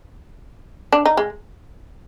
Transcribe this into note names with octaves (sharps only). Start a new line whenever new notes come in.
D4
D#4
G#3